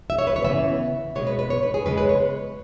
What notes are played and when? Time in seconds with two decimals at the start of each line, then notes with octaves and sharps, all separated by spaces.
0.10 E5
0.18 C#5
0.27 B4
0.36 C#5
0.45 C#3 E3 B3 E5
1.15 B2 G#3 B3 C#5
1.27 B4
1.39 B4
1.50 C#5
1.63 B4
1.74 G#4
1.86 E2 C#3 G#3 C#4 B4
1.98 B4
2.09 C#5